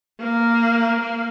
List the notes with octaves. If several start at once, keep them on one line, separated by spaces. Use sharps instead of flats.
A#3
A#3